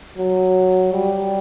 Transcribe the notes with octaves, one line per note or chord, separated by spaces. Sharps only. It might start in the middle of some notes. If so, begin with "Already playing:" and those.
F#3
G3